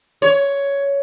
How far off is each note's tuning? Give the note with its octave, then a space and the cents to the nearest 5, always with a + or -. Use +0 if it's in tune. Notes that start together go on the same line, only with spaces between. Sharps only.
C#5 +10